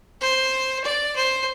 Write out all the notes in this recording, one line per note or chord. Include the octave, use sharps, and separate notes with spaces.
C5
D5
C5